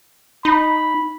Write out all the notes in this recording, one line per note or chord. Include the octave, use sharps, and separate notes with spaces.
D#4 B5